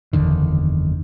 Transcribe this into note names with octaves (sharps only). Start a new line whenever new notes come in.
F#1 E2 D3 D#3